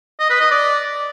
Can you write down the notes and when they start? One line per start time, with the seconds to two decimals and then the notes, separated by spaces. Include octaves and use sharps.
0.20 D#5
0.30 B4
0.41 D#5
0.51 D5